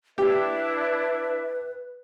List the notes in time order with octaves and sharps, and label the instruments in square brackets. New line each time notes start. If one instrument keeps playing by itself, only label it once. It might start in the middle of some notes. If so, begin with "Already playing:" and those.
[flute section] D4 E4 E5 [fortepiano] G4 [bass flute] B4